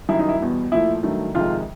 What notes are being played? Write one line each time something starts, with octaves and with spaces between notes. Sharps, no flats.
F#2 D#3 G3 E4
D#4
E4
E2 B2 G3
A#2 F3 A3 E4
G2 D#3 F#3 A3
F2 C3 D#3 G#3 F4